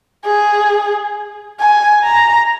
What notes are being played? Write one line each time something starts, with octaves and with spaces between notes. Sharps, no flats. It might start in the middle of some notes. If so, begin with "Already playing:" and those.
G#4
G#5
A#5